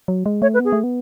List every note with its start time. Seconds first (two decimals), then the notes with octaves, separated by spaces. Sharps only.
0.08 F#3
0.26 G#3
0.42 A3 C#5
0.54 B4
0.60 B3 G#4
0.72 A3
0.84 B3